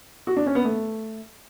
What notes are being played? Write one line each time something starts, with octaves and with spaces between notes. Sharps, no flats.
F#4
D4
C#4
B3
A3